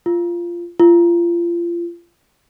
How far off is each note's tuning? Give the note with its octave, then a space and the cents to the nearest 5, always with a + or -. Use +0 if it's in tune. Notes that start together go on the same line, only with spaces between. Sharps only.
F4 -15
F4 -30